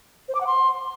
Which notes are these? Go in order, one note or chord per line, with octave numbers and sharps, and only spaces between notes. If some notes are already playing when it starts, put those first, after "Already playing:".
C5
D6
F#5
C6